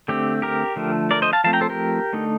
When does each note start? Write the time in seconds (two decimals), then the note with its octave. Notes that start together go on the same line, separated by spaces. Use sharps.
0.08 D3 A3 C4 G4
0.42 G4 A#4
0.76 D3 F3 A3
1.11 A#4 D5
1.22 C5 D#5
1.33 F5 A5
1.44 F3 A3 C4 F5 A5
1.53 G5 A#5
1.61 A4 C5
1.69 G4 A#4
2.13 D3 A3 D#4